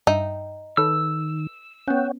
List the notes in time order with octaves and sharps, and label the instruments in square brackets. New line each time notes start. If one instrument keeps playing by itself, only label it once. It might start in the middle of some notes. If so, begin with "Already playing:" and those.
[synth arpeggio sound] G2 E5 G5 [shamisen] D#4
[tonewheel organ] D#3 [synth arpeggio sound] A4 B4 C#5 [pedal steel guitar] E6
[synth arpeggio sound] B3 C#4 [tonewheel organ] C#5 F#5 G5